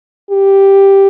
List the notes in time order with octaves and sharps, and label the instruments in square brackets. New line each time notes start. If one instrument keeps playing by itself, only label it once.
[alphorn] G4